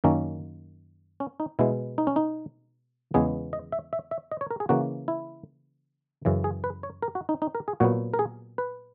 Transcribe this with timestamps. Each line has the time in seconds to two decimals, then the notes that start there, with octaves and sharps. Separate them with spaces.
0.04 F#2 D#3 A#3 C#4
1.20 C#4
1.40 D#4
1.59 B2 G#3 B3 E4
1.98 D#4
2.07 C#4
2.16 D#4
3.14 E2 C#3 G#3 B3 G#4
3.53 D#5
3.72 E5
3.93 E5
4.11 E5
4.32 D#5
4.41 C#5
4.51 A#4
4.60 G#4
4.69 C#3 E3 A#3 F#4
5.08 E4
6.25 F#2 C#3 E3
6.44 G#4
6.64 B4
6.83 C#5
7.02 A#4
7.15 F#4
7.29 D#4
7.42 D#4
7.55 A#4
7.68 G#4
7.80 A#2 F#3 B3 F#4
8.14 A#4
8.19 G#4
8.58 B4